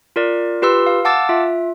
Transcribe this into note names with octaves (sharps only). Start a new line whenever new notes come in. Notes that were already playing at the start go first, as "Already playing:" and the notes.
F4 A#4 D5
F4 G4 B4 C6 E6
F5
F5 F#5 A5 D6 E6 A6
F4 E5